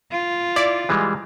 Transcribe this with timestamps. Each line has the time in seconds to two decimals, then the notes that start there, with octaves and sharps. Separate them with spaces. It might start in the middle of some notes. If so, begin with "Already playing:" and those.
0.11 F4
0.56 E4 D5
0.89 E3 G3 G#3